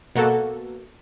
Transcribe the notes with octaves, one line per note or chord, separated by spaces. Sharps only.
B2 A#3 F#4 A4